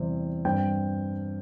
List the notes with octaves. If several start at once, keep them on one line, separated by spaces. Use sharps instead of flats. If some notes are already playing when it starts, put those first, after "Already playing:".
Already playing: E2 C3 G3 C4
G2 G3 C4 G5